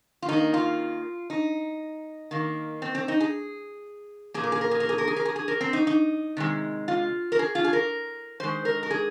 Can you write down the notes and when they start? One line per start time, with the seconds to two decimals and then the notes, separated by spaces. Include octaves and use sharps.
0.22 F4
0.29 D#3 A#3 D#4
0.54 F4
1.30 D#4
2.31 D#3 A#3
2.82 C4
2.95 C4
3.08 D#4
3.20 G#4
4.34 A#2 A#3 G#4
4.43 A#4
4.52 G#4
4.61 A#4
4.71 G#4
4.80 A#4
4.89 G#4
4.98 A#4
5.07 G#4
5.16 A#4
5.25 G#4
5.36 G#4
5.48 A#4
5.61 C4
5.73 D#4
5.87 D#4
6.37 C3 D#3 G#3
6.88 F4
7.32 A#4
7.39 G#4
7.55 F4
7.64 G#4
7.73 A#4
8.40 D#3 G#3 C5
8.65 A#4
8.83 A#4
8.90 G#4